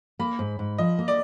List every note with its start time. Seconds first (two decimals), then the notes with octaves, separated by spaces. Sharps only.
0.19 A#3 B5
0.39 G#2
0.59 G#2
0.78 F3 D#5
0.99 A#3
1.08 D5